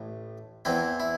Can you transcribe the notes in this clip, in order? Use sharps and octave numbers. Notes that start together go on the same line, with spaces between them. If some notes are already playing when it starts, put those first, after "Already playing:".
Already playing: A1 A2
E2 E3 C4 E4
E4